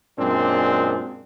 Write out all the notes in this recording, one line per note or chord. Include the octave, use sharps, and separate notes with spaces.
F#2 A#2 G#3 C4 D4